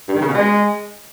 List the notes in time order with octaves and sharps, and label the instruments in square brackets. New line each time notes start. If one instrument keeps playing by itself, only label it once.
[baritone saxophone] G2
D#3
C#3
B2
G#3